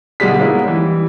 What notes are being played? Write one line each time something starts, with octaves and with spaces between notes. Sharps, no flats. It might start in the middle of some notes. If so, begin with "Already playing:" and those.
G1 B2 G3 G#3 B6
G3 G#3 A#3 B3 C#4 E4
E3 G3